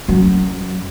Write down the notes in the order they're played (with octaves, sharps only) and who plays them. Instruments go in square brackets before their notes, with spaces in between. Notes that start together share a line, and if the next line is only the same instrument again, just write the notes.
[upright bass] F#2 F#3